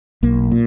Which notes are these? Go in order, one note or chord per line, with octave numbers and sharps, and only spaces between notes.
B1 A#3
A#2